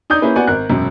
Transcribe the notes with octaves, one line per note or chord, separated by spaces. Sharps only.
D#4 D5 D#6 G6
A#3 C#4 E4 G#4 B4
B3 F#4 D5 F#5 G#5
G#1 A#4 F#6
E1 F#2